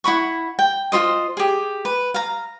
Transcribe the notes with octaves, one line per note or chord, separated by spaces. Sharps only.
E4 F#5 B5 C#6
G5
F4 F#4 C5 D#5
G4 G#4
B4
F5 A#5